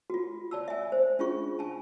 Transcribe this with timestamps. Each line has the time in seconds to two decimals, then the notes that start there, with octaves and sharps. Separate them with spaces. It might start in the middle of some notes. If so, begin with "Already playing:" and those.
0.10 F4 F#4
0.51 D5 A5 E6
0.68 E5 G#5
0.92 C5
1.19 C#4 D4 F4 G#4 C#6
1.59 G#5 A5